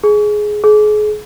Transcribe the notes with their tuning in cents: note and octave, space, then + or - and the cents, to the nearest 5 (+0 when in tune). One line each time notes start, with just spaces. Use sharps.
G#4 +10
G#4 +30